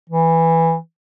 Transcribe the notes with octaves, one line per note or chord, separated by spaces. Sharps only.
E3